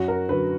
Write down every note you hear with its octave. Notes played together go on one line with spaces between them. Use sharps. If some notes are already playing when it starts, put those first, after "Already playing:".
Already playing: F#2 F#4
A#4
D3 F#3 B4